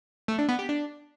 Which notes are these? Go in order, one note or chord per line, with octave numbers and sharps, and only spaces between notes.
A3
D4
B3
G4
D4